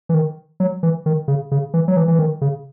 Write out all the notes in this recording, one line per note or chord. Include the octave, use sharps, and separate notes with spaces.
E3
D#3
F#3
E3
D#3
C#3
C#3
E3
F#3
E3
E3
D#3
C#3